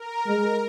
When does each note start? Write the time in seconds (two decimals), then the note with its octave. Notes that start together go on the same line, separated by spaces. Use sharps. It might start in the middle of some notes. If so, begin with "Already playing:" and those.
Already playing: A#4
0.27 G#3